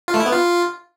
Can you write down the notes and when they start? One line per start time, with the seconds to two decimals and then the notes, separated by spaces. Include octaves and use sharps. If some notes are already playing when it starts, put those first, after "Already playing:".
0.08 F4
0.14 A3
0.20 E4
0.26 B3
0.32 F4